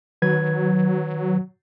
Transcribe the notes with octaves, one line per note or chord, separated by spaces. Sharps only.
D#3 F#3 B4 G#6